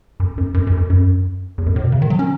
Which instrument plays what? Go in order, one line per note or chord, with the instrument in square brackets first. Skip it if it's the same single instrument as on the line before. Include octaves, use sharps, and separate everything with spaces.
[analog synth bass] F#2
F#2
F#2
F#2
F#2
F#2
E2
F#2
A2
B2
C#3
D#3
F#3
C#4